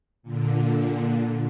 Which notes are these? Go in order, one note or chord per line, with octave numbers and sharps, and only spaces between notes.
A#2 D3